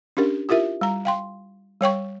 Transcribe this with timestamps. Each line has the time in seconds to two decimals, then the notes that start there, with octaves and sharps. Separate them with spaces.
0.17 C#4 D4 G4 A#4
0.49 E4 F4 G4 A#4 E5
0.81 G3 A#5
1.05 F5 G5 C6
1.81 G3 C#5 G5 C#6